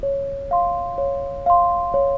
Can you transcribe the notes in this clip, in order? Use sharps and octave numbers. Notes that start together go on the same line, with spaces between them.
C#5
F5 C6
C#5
F5 C6
C#5